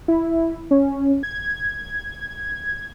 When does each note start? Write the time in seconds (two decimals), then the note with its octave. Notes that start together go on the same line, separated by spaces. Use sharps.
0.08 E4
0.71 C#4
1.23 G#6